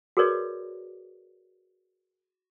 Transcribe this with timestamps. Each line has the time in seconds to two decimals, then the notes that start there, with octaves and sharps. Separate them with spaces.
0.17 F#4 G#4 A#4 B4 C#5 D5